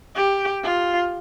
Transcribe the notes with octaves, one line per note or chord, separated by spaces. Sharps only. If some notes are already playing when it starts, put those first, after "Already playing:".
G4
F4